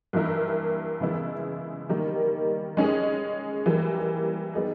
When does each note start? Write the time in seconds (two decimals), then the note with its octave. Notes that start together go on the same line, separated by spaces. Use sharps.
0.13 G2 E3 A#3 E4 A#4
1.01 C#3 E3 G#3 B3 E4
1.89 D#3 G3 A#3 D#4
2.77 G#3 C#4 G#4 D#5
3.66 E3 G3 A#3
4.54 G3 B3 D#4 G#4